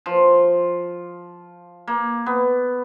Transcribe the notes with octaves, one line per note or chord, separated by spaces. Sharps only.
F3
A#3
B3